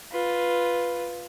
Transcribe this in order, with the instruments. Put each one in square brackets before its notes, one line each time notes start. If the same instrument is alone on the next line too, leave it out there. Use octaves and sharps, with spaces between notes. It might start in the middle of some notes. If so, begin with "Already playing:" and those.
[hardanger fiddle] F4 B4